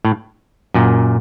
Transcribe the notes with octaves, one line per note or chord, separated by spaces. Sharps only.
A2
F#2 A#2